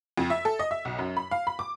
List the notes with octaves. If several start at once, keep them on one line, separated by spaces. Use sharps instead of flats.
F2
E5
A4
D#5
E5
B1
F#2
B5
F5
B5
D6